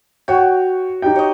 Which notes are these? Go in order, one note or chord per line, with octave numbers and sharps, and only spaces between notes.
F#4 C#5 G5
D#4 G4 G5
C#5 D#5